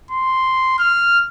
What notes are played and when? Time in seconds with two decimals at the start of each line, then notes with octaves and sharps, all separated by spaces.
0.11 C6
0.79 F6